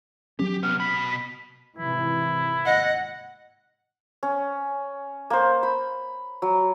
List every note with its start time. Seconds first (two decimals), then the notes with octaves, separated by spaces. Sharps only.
0.39 F#3 C#4 G4
0.63 C3 B3 F6
0.80 B2 B5 B6
1.78 G#1 C3 E3 E4
2.66 G#1 D#2 D#5 F#5
4.23 C#4
5.30 A#3 C5
5.63 B5
6.42 F#3